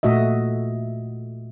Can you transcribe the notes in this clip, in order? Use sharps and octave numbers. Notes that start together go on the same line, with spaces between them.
A#2 A3 F#4 D#5 E5